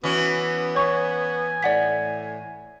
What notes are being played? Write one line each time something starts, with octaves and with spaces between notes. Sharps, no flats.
E3 B3 C#4 F#4
C#5 G#5 C#6
A2 D5 F#5 B6